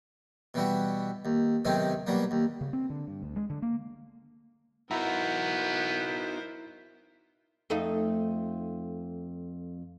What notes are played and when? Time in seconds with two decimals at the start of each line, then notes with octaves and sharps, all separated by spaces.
0.54 B2 E3 G3 F#4
1.25 D#2
1.65 B1 G#2 C3 D#3 C4 G#5
2.07 B2 F#3 G3 A#3
2.31 D#2
2.61 C#3
2.73 C4
2.90 D3
3.07 G2
3.23 D2
3.36 G#3
3.50 D3
3.62 A#3
4.91 B3 D#4 E4 F#4 A#4 C5 E5 A#5
7.70 F2 A3 D#4